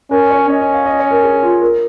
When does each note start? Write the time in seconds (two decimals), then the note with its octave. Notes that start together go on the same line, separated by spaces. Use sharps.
0.11 C#4 A#4
0.30 C#5
0.48 C#4 D#5
0.61 D#5
0.74 F5
0.86 D#5
0.99 C#5
1.11 A#4
1.24 G#4
1.42 F4
1.62 A#4